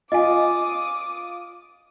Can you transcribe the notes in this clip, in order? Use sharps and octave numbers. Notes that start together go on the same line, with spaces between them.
F4 D#5 G#5 D6 D#6